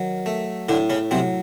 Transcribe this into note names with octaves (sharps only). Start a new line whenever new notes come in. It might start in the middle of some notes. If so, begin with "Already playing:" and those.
Already playing: D#3 F#3
A3
A2 D3 D4
C#3 C#4
C3 F#3 C4